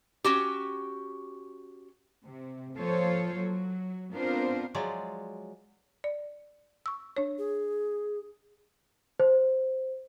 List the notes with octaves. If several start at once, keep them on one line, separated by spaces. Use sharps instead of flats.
C#4 F#4 G4
C3
F3 A#3 F4 A4 C5 C#5
F#3
B3 C4 D4 F4 A#4 C5
F3 F#3 G#3 D5
D5
C#6 E6
D4 C#5
G#4
C5